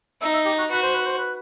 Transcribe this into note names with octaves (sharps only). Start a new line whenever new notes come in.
D#4 E5
E5
G4
F#4
F#4 B4
C5
B4
C5
B4